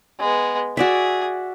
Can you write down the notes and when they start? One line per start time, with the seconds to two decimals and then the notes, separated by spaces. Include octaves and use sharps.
0.19 G#3 B3
0.77 F#4 G#4 D5 E5